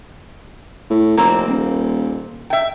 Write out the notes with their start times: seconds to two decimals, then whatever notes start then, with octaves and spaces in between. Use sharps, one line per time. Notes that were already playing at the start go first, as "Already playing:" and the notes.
0.90 A2
1.17 F1 A#3 C4
1.47 D#1
2.50 E5 G5